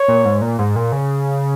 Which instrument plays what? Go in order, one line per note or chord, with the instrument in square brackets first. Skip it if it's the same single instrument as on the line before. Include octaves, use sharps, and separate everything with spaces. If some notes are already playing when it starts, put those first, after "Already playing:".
Already playing: [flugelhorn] C#5
[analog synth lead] A#2
G#2
A#2
G#2
A#2
C#3